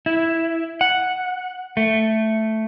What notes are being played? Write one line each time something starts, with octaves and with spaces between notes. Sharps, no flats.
E4
F#5
A3